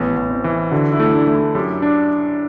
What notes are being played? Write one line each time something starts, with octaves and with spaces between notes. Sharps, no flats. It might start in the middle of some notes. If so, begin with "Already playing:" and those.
Already playing: A1 E3 B3
A1
C4
E3
D3 F#4
E4
A3
D4
A3
E4
F#2 G4
D4